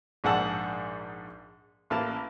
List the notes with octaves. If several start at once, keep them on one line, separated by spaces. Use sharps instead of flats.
A#1 G#2 G#4 F#5 A5 E6
A1 A#3 E4 A#4 A5